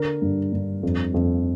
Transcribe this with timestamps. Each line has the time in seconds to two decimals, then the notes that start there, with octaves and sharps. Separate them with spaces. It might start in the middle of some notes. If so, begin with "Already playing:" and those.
Already playing: D3 A#4
0.22 G2
0.53 G2
0.83 F2
1.14 F2